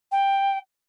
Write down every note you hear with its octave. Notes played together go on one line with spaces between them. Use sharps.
G5